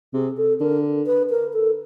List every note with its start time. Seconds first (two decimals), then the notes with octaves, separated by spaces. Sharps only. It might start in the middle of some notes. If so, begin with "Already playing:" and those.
0.14 C3 G#4
0.37 A4
0.60 D3 A#4
1.06 B4
1.30 A#4
1.53 A4